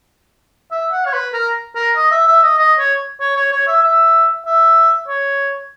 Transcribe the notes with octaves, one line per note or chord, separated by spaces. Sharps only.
E5
F#5
C#5
B4
A#4
A#4
D#5
E5
E5
D#5
D#5
C#5
C#5
C#5
C#5
E5
E5
E5
C#5